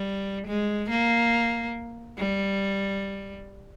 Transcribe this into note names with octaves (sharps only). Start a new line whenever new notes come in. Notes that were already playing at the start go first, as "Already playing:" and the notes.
Already playing: G3
G#3
A#3
G3